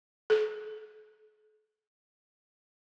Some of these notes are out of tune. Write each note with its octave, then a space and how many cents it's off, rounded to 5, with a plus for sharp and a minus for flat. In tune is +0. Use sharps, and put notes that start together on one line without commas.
A4 -45